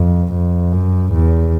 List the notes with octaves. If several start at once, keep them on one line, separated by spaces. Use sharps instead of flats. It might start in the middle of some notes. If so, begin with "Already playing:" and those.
Already playing: F2
F2
F#2
E2